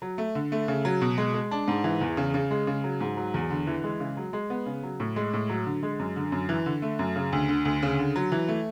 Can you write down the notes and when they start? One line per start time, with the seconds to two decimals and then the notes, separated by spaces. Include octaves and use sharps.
0.02 F#3
0.18 A3
0.35 D3
0.52 A3
0.68 C#3
0.85 F#3
1.01 B2
1.18 G#3
1.34 G#3
1.51 D4
1.68 G#2
1.84 E3
2.01 E2
2.17 C#3
2.34 C#3
2.51 G#3
2.67 C#3
2.84 F#3
3.01 G#2
3.17 F#3
3.34 E2
3.50 D3
3.67 E3
3.84 G#3
4.00 C#3
4.17 F#3
4.33 G#3
4.50 B3
4.66 C#3
4.83 F#3
5.00 A2
5.16 G#3
5.33 A2
5.49 F#3
5.66 D3
5.83 G#3
5.99 F#2
6.16 D3
6.32 F#2
6.49 E3
6.66 D3
6.82 A3
6.99 F#2
7.16 C#3
7.32 D2
7.49 D3
7.65 D2
7.82 C#3
7.99 D3
8.16 F#3
8.32 E3
8.48 A3